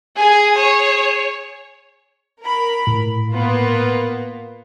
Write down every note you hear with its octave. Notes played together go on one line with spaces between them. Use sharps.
G#4 G#5
C#5
A#4 B5
A2
A#3 B3 F4